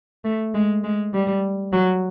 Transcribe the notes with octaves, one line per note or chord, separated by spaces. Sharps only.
A3
G#3
G#3
G3
F#3